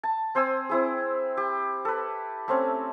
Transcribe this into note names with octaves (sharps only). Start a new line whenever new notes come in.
A5
C4 C5 G#5 E6
C4 E4 G#4
G4
A4 B4
A3 C4 C#4